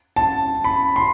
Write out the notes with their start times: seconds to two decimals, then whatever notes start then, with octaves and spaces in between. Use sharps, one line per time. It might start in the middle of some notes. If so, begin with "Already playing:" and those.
0.16 A5
0.64 B5
0.96 C6